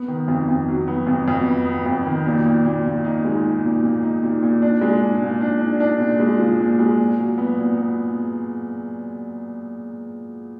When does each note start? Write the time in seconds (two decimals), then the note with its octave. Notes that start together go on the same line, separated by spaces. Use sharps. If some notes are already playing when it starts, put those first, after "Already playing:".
Already playing: B3
0.08 D#3
0.28 F2
0.49 F2
0.68 F#3
0.88 B3
1.07 F2
1.28 F2
1.47 B3
1.66 B3
1.86 F2
2.06 D#3
2.26 A#2
2.46 A#2
2.65 A#2
2.85 A#2
3.04 D#4
3.25 G#3
3.44 D#4
3.64 A#2
3.83 A#2
4.03 D#4
4.23 A#2
4.42 A#2
4.62 D4
4.81 G#3
5.02 D4
5.22 A#2
5.41 D4
5.61 D4
5.80 D4
6.00 A#2
6.20 G#3
6.39 F3
6.60 A#2
6.79 G#3
6.99 A#2
7.18 F#3
7.38 B3
7.59 A#2
7.78 B3